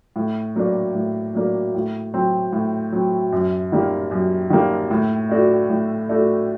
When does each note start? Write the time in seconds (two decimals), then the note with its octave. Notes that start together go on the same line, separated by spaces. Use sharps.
0.16 A2
0.56 F#3 A#3 D4
0.95 A2
1.35 F#3 A#3 D4
1.74 A2
2.14 F#3 C4
2.53 A2
2.92 F#3 C4
3.32 F#2
3.72 D#3 G3 A#3
4.11 F#2
4.50 D#3 G3 A#3
4.91 A2
5.29 A3 D4 F#4
5.69 A2
6.09 A3 D4 F#4